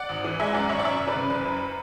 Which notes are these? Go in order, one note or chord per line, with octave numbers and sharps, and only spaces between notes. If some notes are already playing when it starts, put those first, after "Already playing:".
Already playing: D5 F#5
G#1
E3
G#3 E5 G#5
F#2 D5 F#5
G#1 C#5 E5
D5
F#2 C#5 E5
F#1
B4 D5
C#3
F#1 B4
F#2